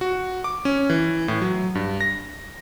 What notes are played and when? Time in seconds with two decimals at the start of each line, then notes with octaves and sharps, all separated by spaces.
0.01 F#4
0.44 D6
0.65 C#4
0.90 E3
1.28 A2
1.42 F#3
1.75 G2
2.01 A#6